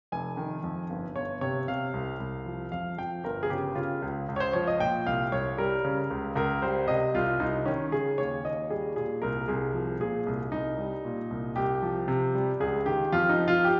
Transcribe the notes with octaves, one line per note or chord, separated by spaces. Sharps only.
F1 G#5
D#3
F2
G1
G1 C#5
C3 C#5
C3 F5
C2
C2
F3
F2 F5
F3 G5
G1 A#4
G#4
C#3 G4
C#3 F4
C#2
C#2
C#5
C5
F3 C#5
D#5
A#2 G5
C2 F5
C2 C#5
G3 A#4
C#3
C#2
C#2 A#4
G3 C5
C3 D#5
C2 F4
C2 D#4
D#3 C#4
C#3 G#4
D#2 C#5
D#2 D#5
G3 G#4
A#2 G#4
C2 A#4
C2 G#4
F3
A#2 G#4
C2
C2 D#4
G3
A#2
C2
C2 G4
F3
C3
G3
C#2 G#4
D#3 G4
F2 F4
D#4
F3
F4
G4